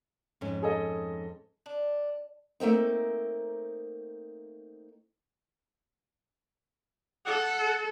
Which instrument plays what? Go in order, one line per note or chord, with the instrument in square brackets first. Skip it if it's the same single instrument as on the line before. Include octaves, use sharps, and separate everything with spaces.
[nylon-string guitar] F2 G#2 C#4
[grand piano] G#4 A4 D#5
[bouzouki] D4
[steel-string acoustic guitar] A3 A#3 C4 D#4
[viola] A4 [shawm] F#5